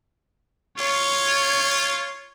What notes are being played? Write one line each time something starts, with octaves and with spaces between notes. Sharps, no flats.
F4 C#5